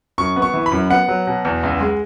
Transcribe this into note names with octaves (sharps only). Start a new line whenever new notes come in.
F#2 C#6
B3
C#6
E3
B5
F#2
B3 F#5
F#3
B2
E2
C#2
G#3